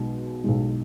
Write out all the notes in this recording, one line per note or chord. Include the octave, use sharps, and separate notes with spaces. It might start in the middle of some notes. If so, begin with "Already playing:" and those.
Already playing: B1 B2 G#3
B1 B2 G#3